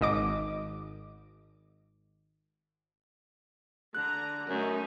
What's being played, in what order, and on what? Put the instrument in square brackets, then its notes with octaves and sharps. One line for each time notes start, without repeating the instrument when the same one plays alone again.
[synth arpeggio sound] G#1 D#5 D6
[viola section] D3 A#5 [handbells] F#6
[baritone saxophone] F#2 [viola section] A3 D#4